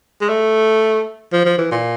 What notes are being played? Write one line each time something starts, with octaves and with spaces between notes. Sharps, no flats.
G#3
A3
F3
F3
E3
A#2